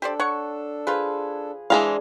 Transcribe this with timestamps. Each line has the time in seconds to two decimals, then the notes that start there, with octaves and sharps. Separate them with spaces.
0.02 D4 G4 A4 C5 D5
0.20 C#5 F#5 C#6
0.87 F3 F4 G#4 B4
1.70 E3 G#3 D4 G#4 C5 F5